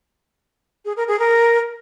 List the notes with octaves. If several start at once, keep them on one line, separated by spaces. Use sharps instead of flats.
G#4
A#4
G#4
A#4